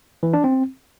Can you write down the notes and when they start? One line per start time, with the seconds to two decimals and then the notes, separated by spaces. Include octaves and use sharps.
0.23 E3
0.33 D4
0.44 C4